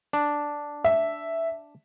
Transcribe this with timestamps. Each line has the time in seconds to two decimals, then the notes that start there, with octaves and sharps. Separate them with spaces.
0.13 D4
0.84 E5